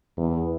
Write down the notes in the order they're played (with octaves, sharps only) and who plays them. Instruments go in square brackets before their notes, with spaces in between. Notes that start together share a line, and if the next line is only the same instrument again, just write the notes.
[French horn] E2